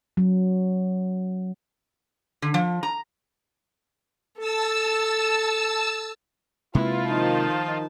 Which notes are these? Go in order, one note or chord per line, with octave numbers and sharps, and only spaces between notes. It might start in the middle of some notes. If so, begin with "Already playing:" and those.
F#3
D3
F3
A#5
A4 A5 E6
C3 G#3 A#3 E4 F4 B4
D#3 F3 D#4 A5